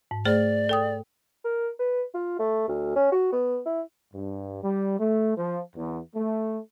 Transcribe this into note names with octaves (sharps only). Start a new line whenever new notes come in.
G#2
A3 G#4 C5 D5
A4 G5 D#6
A#4
B4
F4
A3
D2
C#4
F#4
B3
E4
G2
G3
A3
F3
E2
A3